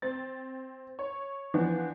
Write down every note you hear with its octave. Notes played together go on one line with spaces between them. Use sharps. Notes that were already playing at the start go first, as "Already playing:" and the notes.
C4 A6
C#5
E3 F3 B3 D4